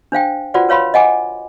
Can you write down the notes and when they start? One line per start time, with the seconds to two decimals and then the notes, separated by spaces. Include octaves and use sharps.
0.12 D4 C5 F5 G5
0.54 F4 F#4 B4 C5 D5 F#5
0.69 B4 C#5 F5 B5 C6
0.94 D#5 F#5 G#5 D6